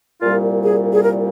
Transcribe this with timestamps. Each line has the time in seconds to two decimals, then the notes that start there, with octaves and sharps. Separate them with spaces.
0.22 C2 A#2 G3 F4
0.63 G#4
0.94 G#4
1.03 A#4